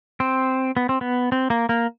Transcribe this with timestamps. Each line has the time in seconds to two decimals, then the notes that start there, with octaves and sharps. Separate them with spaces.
0.20 C4
0.77 B3
0.89 C4
1.01 B3
1.32 C4
1.50 A#3
1.69 A#3